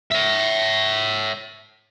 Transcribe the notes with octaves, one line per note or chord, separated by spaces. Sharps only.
C#5 E5